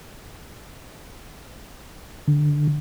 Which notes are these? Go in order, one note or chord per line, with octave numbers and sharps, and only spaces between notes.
D3